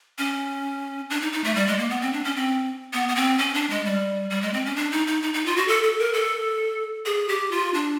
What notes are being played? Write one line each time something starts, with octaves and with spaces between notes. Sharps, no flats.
C#4
D4
D#4
D#4
A3
G3
G#3
A#3
B3
C4
D4
C#4
C4
B3
B3
C4
C#4
D4
G#3
G3
G3
G#3
C4
C#4
D4
D#4
D#4
D#4
D#4
F4
F#4
A4
A4
A#4
A4
G#4
G4
F4
D4